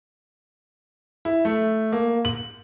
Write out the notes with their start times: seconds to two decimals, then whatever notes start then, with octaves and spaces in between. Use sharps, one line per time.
1.25 E4
1.45 A3
1.93 A#3
2.25 F#7